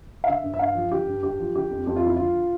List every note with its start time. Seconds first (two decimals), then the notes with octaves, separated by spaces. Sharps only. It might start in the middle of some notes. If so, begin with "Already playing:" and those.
0.24 F5
0.28 D3 E5
0.44 G2
0.54 E5
0.59 G2 F5
0.75 F3
0.91 D3 G4
1.07 G2
1.23 G2 G4
1.39 F3
1.55 D3 G4
1.71 F2
1.87 F2 G4
1.96 F4
2.03 F3 E4
2.16 D3 F4